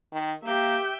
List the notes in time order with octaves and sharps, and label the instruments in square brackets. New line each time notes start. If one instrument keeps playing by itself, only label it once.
[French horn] D#3
[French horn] A#3 [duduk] G4 [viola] E5 G5